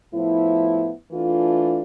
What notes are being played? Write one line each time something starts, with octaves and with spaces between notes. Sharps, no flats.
A2 F3 B3 E4
E3 A3 D4 F4